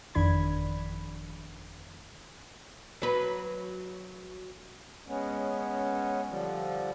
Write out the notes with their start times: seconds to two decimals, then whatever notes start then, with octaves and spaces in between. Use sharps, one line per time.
0.15 G1 F2 D#3 D4 B5 G#6
3.02 F#3 B4
5.07 G#3 B3 C#4
6.28 D3 F3 G3